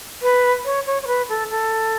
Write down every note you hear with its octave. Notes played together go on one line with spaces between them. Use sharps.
B4
C#5
C#5
C#5
B4
A4
A4